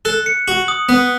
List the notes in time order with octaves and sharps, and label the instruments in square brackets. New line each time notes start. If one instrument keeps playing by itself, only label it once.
[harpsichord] A4 [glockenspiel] F#6
[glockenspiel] C#7
[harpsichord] F#4 [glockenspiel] F#7
[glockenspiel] D#6
[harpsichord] B3 [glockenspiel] F#6